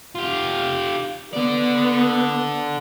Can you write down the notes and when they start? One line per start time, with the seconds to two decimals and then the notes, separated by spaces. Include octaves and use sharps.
0.15 F4 G4
1.33 D3 B3 D5